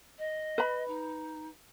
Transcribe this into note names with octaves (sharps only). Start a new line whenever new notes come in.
D#5
B4 B5
D#4